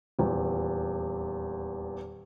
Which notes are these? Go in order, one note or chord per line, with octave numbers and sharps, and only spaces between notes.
D#1 E2